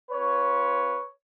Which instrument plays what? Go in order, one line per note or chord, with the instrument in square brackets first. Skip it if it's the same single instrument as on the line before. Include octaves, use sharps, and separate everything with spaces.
[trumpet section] C4 F4 B4 C#5